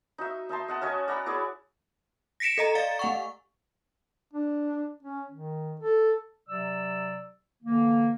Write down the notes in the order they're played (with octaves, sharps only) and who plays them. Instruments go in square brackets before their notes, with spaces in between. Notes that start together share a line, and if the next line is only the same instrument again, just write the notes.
[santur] D#4 F#4 E5
D#4 E5 A5 C6
D#5 F#5 A5
C#4 F#4 C#5 D#5
D5 F#5 A#5 B5
E4 G#4 C#5 D5
[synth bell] A#6 B6 C#7 D7 E7
A4 D#5 A#5
D5 F5 A6
A3 F#5 C#6
[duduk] D4
C#4
D#3
A4
[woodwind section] C3 F#3 D5 E6
D3 E3 A#3